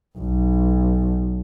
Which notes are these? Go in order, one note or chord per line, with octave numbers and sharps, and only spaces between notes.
B1